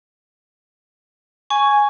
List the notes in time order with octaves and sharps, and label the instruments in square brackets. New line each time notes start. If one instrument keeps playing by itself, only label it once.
[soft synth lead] G#5 [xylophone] C#6